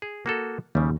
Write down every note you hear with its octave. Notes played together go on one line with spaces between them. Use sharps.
G#4
A#3 F#4 A4
D#2 C#3 G3